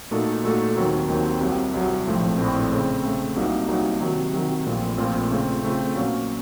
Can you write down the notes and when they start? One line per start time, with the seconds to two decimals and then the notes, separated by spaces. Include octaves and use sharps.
0.11 A#2 A3 D#4 F#4 A4
0.44 A#2 A3 D#4 F#4 A4
0.77 D#2 D#3 F#3 C4
1.08 D#2 D#3 F#3 C4
1.41 C2 C3 F#3
1.74 C2 C3 F#3
2.06 A#1 A2 F3 A3 C4
2.38 A#1 A2 F3 A3 C4
2.71 C#3 A3 C4
3.03 C#3 A3 C4
3.36 C2 C3 F#3 A#3 D#4
3.68 C2 C3 F#3 A#3 D#4
4.01 C3 D#3 F#3
4.33 C3 D#3 F#3
4.66 A#1 A#2 A3 C4 F4
4.98 A#1 A#2 A3 C4 F4
5.30 C#3 A3 C4 F4
5.63 C#3 A3 C4 F4
5.95 A#2 F#3 A#3 C#4